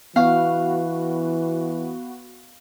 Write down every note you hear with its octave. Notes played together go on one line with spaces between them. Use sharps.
E3 B3 F#4 F5